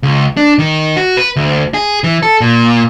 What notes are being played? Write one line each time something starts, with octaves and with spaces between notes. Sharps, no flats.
C#2
D4
D#3
F#4
B4
D2
G#4
E3
A4
A#2